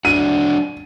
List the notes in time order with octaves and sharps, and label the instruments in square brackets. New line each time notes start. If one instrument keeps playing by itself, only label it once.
[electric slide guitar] F#3 D4 F#4 [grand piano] D#7